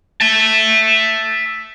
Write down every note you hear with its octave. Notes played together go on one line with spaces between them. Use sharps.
E5 A5